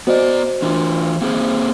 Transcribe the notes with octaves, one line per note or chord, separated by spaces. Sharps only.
B3 F#4 C5 D5 D#5
E3 D4 F4
A#3 C4 G#4